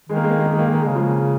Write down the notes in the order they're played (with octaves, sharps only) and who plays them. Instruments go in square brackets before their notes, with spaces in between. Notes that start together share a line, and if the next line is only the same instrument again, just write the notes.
[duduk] D#3 [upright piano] G#3
[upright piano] A#3
G#3
A#3
G#3
A#3
G#3
A#3
G#3
A#3
G#3
[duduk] C#3 [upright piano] A#3
[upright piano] F3 G#3